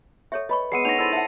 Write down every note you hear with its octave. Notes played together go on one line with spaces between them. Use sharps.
A4 C#5 E5 C#6
B4 D#5 B5 C#6
G#3 B3 E6 C7 C#7 D#7
D4 D#4 C#5 C#6 A#6 F7
E4 A4 C5 E6 A6 D#7
E5 F#5 A5